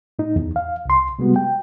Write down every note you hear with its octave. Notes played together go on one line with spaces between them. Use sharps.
A2 D#4
E2
F5
C2 C6
C3 G3 G#3 B3 F#4
G5